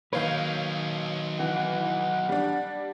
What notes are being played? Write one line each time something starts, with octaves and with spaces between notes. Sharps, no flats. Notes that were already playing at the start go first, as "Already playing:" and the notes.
D#3 F#3 A#3 D#4 B4 C#5 F5 G6
E3 F#5
G3 D4